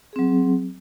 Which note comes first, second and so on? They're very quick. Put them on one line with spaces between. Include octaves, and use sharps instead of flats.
G#4 C4 F#3